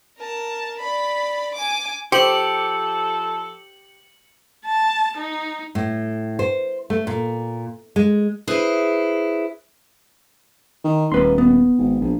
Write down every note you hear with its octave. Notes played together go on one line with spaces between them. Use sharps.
A#4 A5
D5 B5
G#5 D6
F3 G4 A4 C5 C#7 F#7
A5
D#4
A2
C5
A3
A#2
G#3
E4 G#4 B4 C5
D#3
D#1 A#3 B4 C6
B3
G#1
A#1